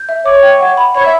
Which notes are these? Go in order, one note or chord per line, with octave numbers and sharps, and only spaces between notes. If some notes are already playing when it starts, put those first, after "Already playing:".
Already playing: G6
E5
C#5 D6
G5
F#5
B5
C#5 B5
E5